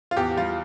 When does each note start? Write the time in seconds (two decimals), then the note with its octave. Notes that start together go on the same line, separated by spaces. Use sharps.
0.11 F4
0.17 E2 G4
0.37 G3 F4